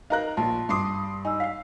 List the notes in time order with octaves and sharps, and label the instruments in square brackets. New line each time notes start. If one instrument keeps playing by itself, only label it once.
[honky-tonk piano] D#4 A#4 [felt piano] F5 A#5 F#6
[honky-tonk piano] A#1 [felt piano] F4 [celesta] A5
[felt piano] G2 C7 [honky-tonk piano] C6 D6 D#6
[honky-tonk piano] D#4 [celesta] G#5 E6
[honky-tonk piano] F5 [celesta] B6 C7